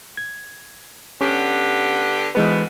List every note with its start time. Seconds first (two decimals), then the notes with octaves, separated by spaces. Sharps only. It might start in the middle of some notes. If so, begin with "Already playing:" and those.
0.17 G#6
1.21 D3 B3 C#4 G4
2.35 D2 G#2 E3 G#3 B3 B4